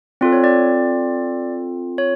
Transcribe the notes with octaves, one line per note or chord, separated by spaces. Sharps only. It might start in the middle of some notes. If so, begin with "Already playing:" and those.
C4 F4 A4 D5
C#5
D5
C#5